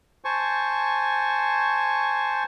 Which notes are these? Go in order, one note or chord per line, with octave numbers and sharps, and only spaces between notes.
C5 G#5 A5 C#6